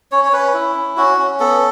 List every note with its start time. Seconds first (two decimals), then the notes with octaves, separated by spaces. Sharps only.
0.11 C#4 C#5
0.24 C#5
0.33 C#4 B4
0.54 E4
0.76 C#4
0.97 C#4 F#4
1.18 C#4
1.40 B3 A4